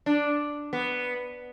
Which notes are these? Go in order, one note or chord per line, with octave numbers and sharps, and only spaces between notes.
D4
B3